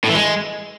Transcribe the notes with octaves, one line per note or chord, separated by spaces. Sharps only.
A2
E3
G#3